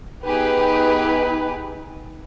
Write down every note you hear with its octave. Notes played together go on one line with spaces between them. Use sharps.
B3 D#4 G4 G#4 B4